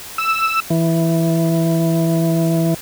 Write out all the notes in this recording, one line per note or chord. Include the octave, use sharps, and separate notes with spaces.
E6
E3